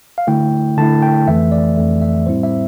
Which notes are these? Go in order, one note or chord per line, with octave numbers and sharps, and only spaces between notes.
F5
D3 A3 E4 G5
D3 A3 E4 A5
G5
F2 E3 A3 E5
D5
F2 E3 A3
E5
A2 G3 C4 E4 C5
E5